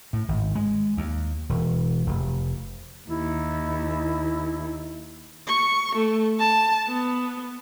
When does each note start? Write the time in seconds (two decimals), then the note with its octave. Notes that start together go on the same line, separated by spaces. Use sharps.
0.13 A2
0.28 G#1
0.55 G#3
0.97 D#2
1.49 E1
2.07 F1
3.09 D#2 E4
5.47 C#6
5.96 A3
6.39 A5
6.87 B3